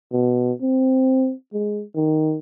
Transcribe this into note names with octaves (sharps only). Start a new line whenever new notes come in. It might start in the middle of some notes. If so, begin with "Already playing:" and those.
B2
C4
G#3
D#3